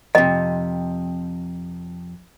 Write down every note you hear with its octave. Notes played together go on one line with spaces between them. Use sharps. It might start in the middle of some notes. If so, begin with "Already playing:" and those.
F2 C3 D#5